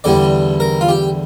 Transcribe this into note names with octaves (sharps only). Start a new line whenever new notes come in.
E2 D3 G3 D5
A#4
F4
G4